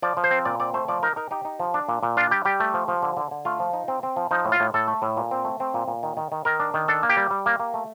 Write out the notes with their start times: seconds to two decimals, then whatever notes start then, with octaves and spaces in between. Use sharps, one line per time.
0.02 F3 D5
0.17 F3
0.24 C5
0.31 C4
0.45 A#2 D5
0.60 C4 D5
0.74 A3 C5
0.88 F3 D5
1.03 D#4 A#4
1.16 D#4 A#4
1.31 D#4 G4
1.45 D#4
1.60 F3
1.74 D4
1.88 A#2
2.03 A#2
2.17 D4 F4
2.31 G3 G4
2.45 G3 G4
2.60 A3
2.74 F3
2.88 F3
3.02 D3
3.17 D3
3.31 D3
3.45 A3 F4
3.60 F3
3.73 D#4
3.88 C4
4.03 C4
4.16 F3
4.31 F3 D#4
4.45 A2
4.52 F4
4.60 A2
4.74 A2 A4
4.88 A3
5.02 A2
5.17 A#2
5.31 C4
5.45 A3
5.60 C4
5.74 A#2
5.88 A#2
6.03 D#3
6.17 D#3
6.32 D#3
6.45 D#3 A#4
6.60 D4
6.74 D#3
6.88 D4 A4
7.03 A#3
7.09 G4
7.17 G3
7.31 G3
7.46 A#3
7.60 A#3
7.74 A3